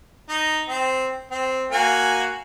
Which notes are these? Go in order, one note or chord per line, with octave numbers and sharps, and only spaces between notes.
D#4
C4
C4
A#3 F#4 G#5